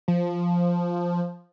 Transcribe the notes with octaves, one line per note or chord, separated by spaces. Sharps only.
F3